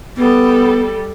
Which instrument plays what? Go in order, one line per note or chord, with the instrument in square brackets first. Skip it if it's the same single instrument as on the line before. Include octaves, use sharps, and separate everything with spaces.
[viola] G3 A4 [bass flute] B3